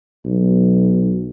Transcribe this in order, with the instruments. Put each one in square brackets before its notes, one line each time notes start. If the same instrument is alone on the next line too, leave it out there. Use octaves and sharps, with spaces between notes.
[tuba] B1